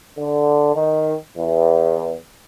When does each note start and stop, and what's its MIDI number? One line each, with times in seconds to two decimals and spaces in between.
0.17 0.71 50
0.75 1.14 51
1.37 2.14 40